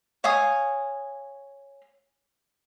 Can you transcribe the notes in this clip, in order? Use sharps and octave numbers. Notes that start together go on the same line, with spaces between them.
C#5 F5 G#5 D#6